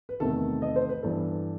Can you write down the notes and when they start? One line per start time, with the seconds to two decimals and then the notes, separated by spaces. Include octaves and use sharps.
0.09 B4
0.20 E2 C3 D#3 A3 A4
0.62 D#5
0.76 C5
0.89 B4
1.03 G2 E3 B3 A4